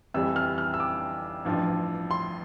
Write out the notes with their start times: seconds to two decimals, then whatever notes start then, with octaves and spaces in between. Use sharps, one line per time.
0.14 F2 E3 G3 E6
0.36 F6
0.58 F6
0.74 E6
0.80 D6
1.45 A1 G2 F3
2.11 C6